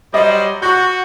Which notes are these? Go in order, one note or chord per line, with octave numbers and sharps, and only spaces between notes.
F#3 G3 C5 D#5
F#4 C#6 G6